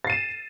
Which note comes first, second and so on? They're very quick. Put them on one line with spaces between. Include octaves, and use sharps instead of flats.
A6 C7 D#7 E7